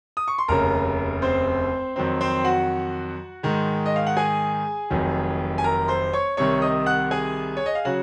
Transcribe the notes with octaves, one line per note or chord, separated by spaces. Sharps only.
D#6
C#6
C6
F1 D#2 C#3 A#4 A#5
C4 C5
F2 D#3 F#3 C4
C4 C5
F#4 F#5
G#2 D#3 G#3
D#5
F5
F#5
G#4 G#5
F1 F2 D#3 F#3
G#5
A#4 A#5
C5 C6
C#5 C#6
C2 C3 D#3 C#5 C#6
D#5 D#6
F#5 F#6
G#4 G#5
C#5
D#5
F5
C#3 F#3 F#4 F#5